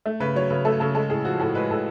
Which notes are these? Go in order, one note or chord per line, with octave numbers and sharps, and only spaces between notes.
A3
C#3 B4
F#3 C#5
C#3 B4
A3 A4
C#3 A4
G#3 A4
A2 G#4
F3 F#4
A2 A4
G#3 B4
A2 A4